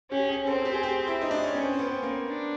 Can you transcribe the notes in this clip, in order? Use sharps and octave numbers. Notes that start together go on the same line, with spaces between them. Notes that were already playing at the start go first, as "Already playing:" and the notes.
C#4 G4
G#4
C4 A4
G4
G#4
G4
E4
D#4
D4
C#4
C4 C#4
C4
B3
C#4
A#3
D4